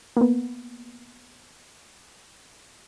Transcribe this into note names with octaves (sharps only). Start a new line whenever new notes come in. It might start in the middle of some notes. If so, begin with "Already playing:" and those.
A#3 B3